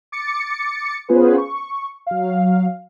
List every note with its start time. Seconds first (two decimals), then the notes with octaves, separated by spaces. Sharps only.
0.12 D6 A6 C#7
1.09 B3 C#4 F4 G#4 B4 C5
1.38 C#6
2.07 F#3 F5